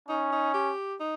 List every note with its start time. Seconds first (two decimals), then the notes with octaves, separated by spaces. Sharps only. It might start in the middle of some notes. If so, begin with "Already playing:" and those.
0.08 C#4 D#4
0.32 D#4
0.54 G4
1.00 D#4